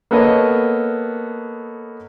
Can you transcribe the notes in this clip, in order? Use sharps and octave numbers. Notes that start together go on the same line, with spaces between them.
A#3 B3 A4 C#5 D#5